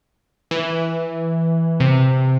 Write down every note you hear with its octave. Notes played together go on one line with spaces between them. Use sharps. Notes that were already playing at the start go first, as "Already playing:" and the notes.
E3
C3